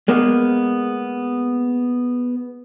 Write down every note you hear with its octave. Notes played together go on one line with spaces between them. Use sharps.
G#3 A#3 B3